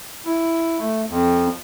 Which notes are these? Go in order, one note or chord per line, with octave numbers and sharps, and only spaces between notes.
E4
A3
F2